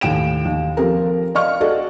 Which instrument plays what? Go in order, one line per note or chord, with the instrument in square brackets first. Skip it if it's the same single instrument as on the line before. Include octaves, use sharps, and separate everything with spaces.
[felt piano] D#2 A2 G5 D7 E7
D#2
F3 C4 G4 A4 A#4
D5 D#5 F5 C#6 F6
F#4 G#4 A4 D5 D#5